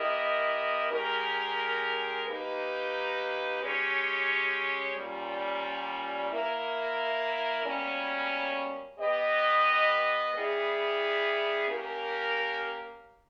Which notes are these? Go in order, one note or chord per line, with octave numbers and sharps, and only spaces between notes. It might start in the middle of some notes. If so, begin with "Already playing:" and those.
Already playing: B3 E4 G4 A#4 D#5
G#3 C#4 G4 A#4
A#3 D#4 G4 B4
G#3 C#4 G4 C#5
A#2 G3 C#4
A#3 E4 A#4
B2 G3 A#3 C#4
B3 G4 B4 D#5
G3 B3 E4 G#4
A#3 C#4 G4 A#4